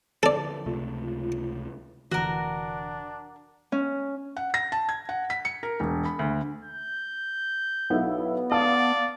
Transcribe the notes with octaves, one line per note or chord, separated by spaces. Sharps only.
D3 F3 A4 D5
C#2 C3 A3 F4
F1 D3 E3 D4 F#4 A#4
C#4
F#5
A#6
A5
G#6
F#5
B6
C#7
A#4
E1
B5
D2
G6
B1 B3 E4
D5 F5 A5 D#6